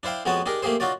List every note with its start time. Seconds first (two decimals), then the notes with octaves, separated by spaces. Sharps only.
0.03 D4 E4 C5 F5 G5
0.25 F2 G#3 B3 F#4 C#5 A5
0.46 D4 D#4 G4 G#4 A#4
0.63 A3 A#3 G4 G#4 C5
0.80 D#4 F4 F#4 C#5 D5